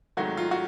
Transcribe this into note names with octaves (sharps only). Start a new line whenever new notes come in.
G#1 G#2 D#3 F#3 A3 F#4
F4
F#4